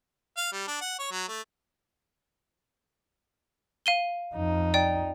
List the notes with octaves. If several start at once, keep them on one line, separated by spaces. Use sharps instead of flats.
F5
G3
D4
F#5
C#5
F#3
A3
F5 D#7 G7
F2 D#4
D5 G5